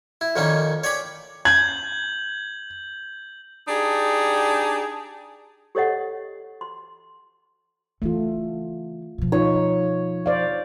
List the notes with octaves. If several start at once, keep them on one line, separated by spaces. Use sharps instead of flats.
E4
F2 A#2 D#3 A#3 C#4 D#4
C#5 D5 G5 G#5 B5 D6
G6 G#6 F#7
D4 D#4 G4 G#4
G4 A4 C#5 D#5 F#5
C6
C#3 E3 A3 F4
B2 F3
D#4 F4 C#5
C5 D5 F5